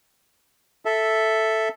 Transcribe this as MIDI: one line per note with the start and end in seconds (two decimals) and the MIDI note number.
0.85 1.69 69
0.85 1.69 76